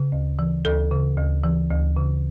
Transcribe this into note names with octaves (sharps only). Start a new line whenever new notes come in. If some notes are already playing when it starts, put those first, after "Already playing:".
Already playing: C#3
D2
E3
D2 A4
C#3
D2
E3
D2
C#3